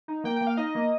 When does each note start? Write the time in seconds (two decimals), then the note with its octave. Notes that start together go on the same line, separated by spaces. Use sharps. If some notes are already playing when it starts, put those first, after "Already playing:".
0.08 D#4
0.24 A#3 G5
0.36 A#3 G5
0.47 F5
0.57 D#4 D#5
0.75 A#3